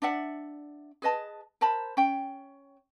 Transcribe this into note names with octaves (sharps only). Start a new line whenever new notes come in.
D4 D5 E5 F#5
G#4 B4 D#5 A5
A#4 C5 A5 B5
C#4 G5